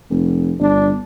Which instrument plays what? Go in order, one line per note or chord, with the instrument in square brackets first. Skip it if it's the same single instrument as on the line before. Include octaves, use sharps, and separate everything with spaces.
[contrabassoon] F1
[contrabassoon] G1 [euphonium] D4